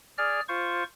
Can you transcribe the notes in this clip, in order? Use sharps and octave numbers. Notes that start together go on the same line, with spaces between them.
G#4 D5 F6
F4 C5 C#6